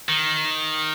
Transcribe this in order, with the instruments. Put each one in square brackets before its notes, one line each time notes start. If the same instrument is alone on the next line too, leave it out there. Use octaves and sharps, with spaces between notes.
[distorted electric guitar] D#3